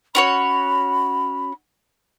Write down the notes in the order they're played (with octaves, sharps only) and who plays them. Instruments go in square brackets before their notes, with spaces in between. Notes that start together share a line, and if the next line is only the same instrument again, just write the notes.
[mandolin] C#4 F#4 C#5 [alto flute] B5